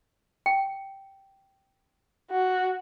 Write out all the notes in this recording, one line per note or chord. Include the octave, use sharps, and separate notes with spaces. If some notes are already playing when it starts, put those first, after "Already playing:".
G5
F#4